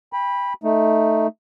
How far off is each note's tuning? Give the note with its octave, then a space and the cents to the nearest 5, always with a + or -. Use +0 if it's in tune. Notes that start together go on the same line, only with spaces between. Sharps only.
G5 +30 B5 -10
A3 +0 D#4 +0